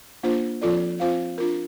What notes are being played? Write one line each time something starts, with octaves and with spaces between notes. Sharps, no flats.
A#3 D4 F4 C5
F3 C4 F4 A4 D5
C4 F4 C5 F5
D4 F4 A#4